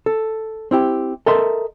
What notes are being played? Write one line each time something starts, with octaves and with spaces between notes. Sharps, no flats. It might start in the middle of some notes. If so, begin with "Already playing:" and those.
A4
C4 E4 G4
A4 A#4 D#5 E5 C6